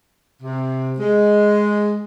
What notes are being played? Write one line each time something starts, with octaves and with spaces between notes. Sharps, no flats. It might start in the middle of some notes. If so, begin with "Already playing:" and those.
C3
G#3